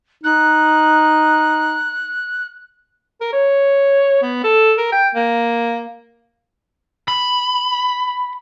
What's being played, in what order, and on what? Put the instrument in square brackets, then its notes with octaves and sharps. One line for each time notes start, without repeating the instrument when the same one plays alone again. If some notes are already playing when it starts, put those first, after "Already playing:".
[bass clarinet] D#4 [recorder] F#6
[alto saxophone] A#4
C#5
B3
A4
A#4
G5
A#3
[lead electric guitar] B5